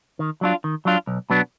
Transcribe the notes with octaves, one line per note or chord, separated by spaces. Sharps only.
D#3
F#3 D4 F4
D#3
F#3 D4 F4
B1
B2 F#3 B3 D4